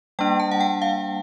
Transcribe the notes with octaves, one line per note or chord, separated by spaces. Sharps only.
G3 A#3 D4 G5
A5
F#5
G5
F5